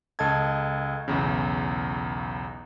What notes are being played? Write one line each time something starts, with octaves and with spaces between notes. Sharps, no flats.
C#2 A4 D#5 A5 G#6
B1 E2 C#3